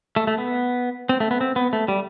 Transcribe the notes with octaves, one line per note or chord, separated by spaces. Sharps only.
A3
A3
B3
C4
A3
B3
C4
B3
A3
G3